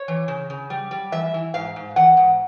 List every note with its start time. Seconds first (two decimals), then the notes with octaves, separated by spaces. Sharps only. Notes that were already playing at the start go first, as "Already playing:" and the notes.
Already playing: C#5
0.08 E3
0.28 C#3
0.50 C#3
0.70 G3
0.91 G3
1.12 E3 E5
1.34 E3
1.54 G#2 F5
1.76 G#2
1.96 E3 F#5
2.17 G#2